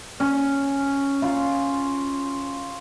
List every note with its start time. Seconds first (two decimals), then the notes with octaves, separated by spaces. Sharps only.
0.20 C#4
1.22 F4